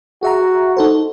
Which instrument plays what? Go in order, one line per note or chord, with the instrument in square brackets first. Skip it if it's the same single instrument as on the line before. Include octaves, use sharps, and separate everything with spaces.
[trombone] F#4 [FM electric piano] G#4 E5 A#5
[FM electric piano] D#4 A4 C5